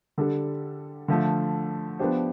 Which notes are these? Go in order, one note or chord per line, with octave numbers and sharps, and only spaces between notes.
D3 G3 D4 A4
D3 F3 A3
F3 B3 D4 G4 C5